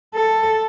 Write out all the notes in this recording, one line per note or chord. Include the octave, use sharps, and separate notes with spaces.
A4